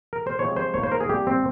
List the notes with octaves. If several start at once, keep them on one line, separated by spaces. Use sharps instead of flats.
A#4
C5
C3 F3 G#3 C4 C#5
C5
D#3 A#3 C#5
C5
A#4
G#4
C3 G3 A#3 G4
C4